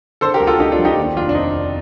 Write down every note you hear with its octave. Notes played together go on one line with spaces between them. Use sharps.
D3 A4 C5
G4 A#4
D2
F4 A4
D2 D#4 G4
D4 F4
F3
D#4 G4
D#2
F1 D4 F4
D4
F1 C4 D#4
D#3